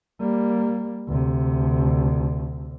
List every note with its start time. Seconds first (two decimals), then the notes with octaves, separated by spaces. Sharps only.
0.20 G3 A#3
1.07 D2 C3